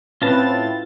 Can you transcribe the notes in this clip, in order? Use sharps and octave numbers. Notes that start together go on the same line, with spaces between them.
A2 C4 C#4 F4 B4 A5 A6